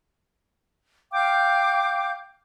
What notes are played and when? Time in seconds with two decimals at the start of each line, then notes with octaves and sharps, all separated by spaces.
1.12 F5 G5 D6 G6